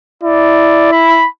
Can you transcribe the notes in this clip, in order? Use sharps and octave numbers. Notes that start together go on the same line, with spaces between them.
E4 D5
B5